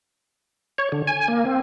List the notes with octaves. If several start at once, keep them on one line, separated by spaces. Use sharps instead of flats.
C#5
D3
G#5
A#3
C4